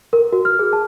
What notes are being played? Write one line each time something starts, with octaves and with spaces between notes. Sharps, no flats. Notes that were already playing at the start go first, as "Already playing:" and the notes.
A#4
F#4
F6
G#4
A5